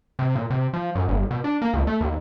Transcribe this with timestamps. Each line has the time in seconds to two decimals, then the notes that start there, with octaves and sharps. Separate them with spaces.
0.19 C3
0.35 A#2
0.50 C3
0.73 F3
0.95 F#2
1.08 G1
1.31 B2
1.44 D4
1.62 A#3
1.74 C#2
1.87 A3
2.01 D#2